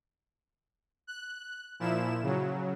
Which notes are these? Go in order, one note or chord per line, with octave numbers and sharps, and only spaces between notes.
F#6
A#2 F3 E4 E7
C#3 F#3